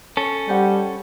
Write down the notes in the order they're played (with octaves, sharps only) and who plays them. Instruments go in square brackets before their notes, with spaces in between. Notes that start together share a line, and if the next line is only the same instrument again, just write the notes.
[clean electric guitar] C#4 A4
[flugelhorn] G3 [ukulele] G4 C5 F#5